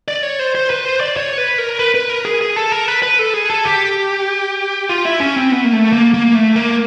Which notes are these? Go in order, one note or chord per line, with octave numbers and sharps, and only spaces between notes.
D5
C#5
C5
C5
B4
C5
D5
C#5
B4
A#4
B4
B4
A#4
G#4
G#4
A4
A#4
B4
B4
A4
G#4
A4
G4
F4
E4
C#4
C4
B3
A#3
A3
A#3
A#3
A3
A#3